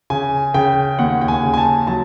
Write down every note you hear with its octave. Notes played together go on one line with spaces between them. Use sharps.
C#3 G#5
C#3 G5
D#2 F#5
G5
G#5
C#3
G#5
A5
F#3 A5